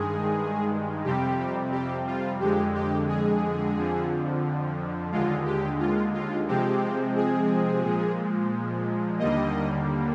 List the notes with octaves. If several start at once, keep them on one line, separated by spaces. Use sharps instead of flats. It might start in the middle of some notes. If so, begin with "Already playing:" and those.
Already playing: G2 D#3 G#3 G#4
F2 C3 G3 C4 G4
G4
F4
F2 D3 G#3 G4
G4
G#4
F2 D3 F3
D#2 D3 G#3 F4
G4
F4
F4
C3 F3 G#3 C4 G4
G#4
A#2 F3 G#3
D#2 D3 G3 A#3 D#5